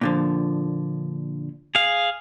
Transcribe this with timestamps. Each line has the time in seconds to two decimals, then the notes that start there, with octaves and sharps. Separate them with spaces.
0.01 A#2 D3 F3
1.75 G#4 F5